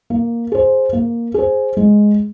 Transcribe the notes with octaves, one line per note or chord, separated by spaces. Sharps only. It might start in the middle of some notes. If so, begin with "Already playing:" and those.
A#3
G#4 C5
A#3
G#4 C5
G#3